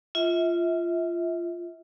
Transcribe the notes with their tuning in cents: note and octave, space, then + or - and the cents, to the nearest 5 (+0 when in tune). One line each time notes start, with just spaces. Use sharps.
F4 -15 E5 -35